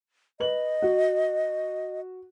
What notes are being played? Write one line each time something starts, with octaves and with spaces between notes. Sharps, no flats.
B4 D#5 F#7
F#4